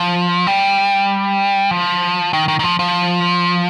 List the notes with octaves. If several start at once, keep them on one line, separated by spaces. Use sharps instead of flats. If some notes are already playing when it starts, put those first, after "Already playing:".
Already playing: F3
G3
F3
D#3
D#3
D#3
F3
F3